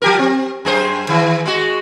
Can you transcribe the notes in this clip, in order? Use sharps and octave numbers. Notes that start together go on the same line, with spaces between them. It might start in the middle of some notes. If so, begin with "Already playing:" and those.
F3 G4 A#4
C4
F#2 G#4 C5
D#3 E3
G#3 F#4